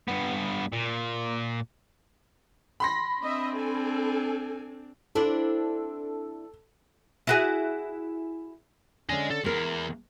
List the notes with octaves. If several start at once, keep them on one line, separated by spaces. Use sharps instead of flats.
G2 B3
A#2
B5 C6 A#6
C4 D4 D#5 E5
A4 G#5
C4 D4 E4 A4
E4 F#4 G#4
D3 C#4 D#5 G#5
A4
E2 G#3 A#4